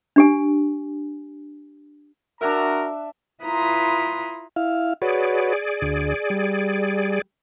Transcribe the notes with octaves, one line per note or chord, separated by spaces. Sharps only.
D4 G4 G#5
D4 F#4 A#4 E5 A#5
E4 F4 B4 A#5 C6 D#6
E4 F5
F#4 G#4 B4 C#5 D5
D2
G3